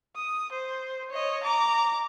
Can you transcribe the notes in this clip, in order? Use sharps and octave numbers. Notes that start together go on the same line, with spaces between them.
D#6
C5
C#5 D#5
A#5 D6